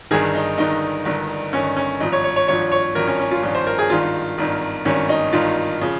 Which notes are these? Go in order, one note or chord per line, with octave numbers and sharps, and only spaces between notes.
G1 G2 D#3 G#4
D#4
G1 G2 D#3 D#4
G1 G2 D#3
G1 G2 D#3 C#4
C#4
G#1 G2 F3 D#4
C#5
C#5
C#5
G#1 G2 F3 C#5
C#5
G#1 G2 F3 A#4
C#4
C#4
F4
G#1 G2 F3
C5
A#4
G#4
G#1 G2 D#3 F4
G#1 G2 D#3
G#1 G2 D#3 C#4
D#4
G#1 G2 D#3 F4
C#3 F3